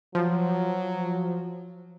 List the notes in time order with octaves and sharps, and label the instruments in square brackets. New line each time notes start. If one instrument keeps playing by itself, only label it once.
[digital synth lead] F3 [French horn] F#3